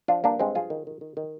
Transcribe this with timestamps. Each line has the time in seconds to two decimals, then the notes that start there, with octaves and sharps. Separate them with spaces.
0.08 F3 D4 F4
0.24 G2 A#3 D4
0.39 G2 G#3 C4
0.55 F3 F4 G#4
0.70 D#3
0.87 D#3
1.01 D#3
1.17 D#3